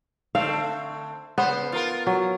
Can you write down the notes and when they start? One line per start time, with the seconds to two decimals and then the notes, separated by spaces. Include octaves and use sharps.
0.35 D3 A3 C4 F5
1.38 C#3 B3 C5
1.72 F4 A#4
2.07 F#3